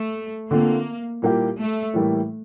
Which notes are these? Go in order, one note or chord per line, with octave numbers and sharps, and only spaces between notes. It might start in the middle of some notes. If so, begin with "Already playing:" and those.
Already playing: A3
D3 A3 A#3 C4 F4
A#2 G3 A#3 E4 G4
A3
A2 E3 G3 A#3 E4